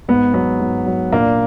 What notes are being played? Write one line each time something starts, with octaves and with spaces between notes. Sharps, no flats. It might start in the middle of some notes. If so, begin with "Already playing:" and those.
G#2 B3
F#3 B3
G#2
F#3
A#2 A#3 D4